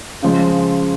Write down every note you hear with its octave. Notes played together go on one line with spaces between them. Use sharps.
C#3 F3 G#3